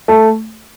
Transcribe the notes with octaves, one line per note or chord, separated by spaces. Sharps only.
A3